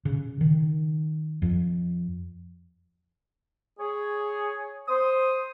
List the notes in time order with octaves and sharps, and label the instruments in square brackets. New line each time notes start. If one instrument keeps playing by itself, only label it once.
[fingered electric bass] C#3
D#3
F2
[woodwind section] G#4 C#5
C5 D#6